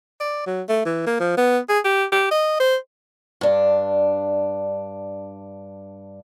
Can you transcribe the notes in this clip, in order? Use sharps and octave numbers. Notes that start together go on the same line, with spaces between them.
D5
F#3
A3
E3
A#3
F3
B3
G#4
G4
G4
D#5
C5
G2 D4